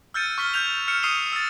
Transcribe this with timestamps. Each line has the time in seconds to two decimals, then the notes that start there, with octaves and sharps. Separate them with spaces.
0.14 E6 F6 G6 A6 C#7 D#7
0.38 C#6 F6 B6 G7
0.54 F6 G6 F7
0.88 F6 C#7 E7
1.03 C#6 D#6 C7 D#7 F7 G7
1.32 E6 A6